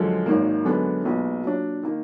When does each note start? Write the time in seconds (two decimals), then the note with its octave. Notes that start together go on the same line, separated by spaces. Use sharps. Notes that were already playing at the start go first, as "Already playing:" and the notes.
Already playing: F#2 D3 F3 G#3
0.26 G#1 G#2 D#3 F#3 A#3
0.65 F#2 D3 G#3 B3 D4
1.04 B1 A#2 G#3 B3
1.43 A#2 F#3 D4
1.83 D#3 A#3